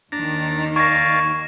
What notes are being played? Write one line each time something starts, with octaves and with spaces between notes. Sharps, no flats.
D#2 D#3 D4 A#5
D5 F5 G#5 C#6 A#6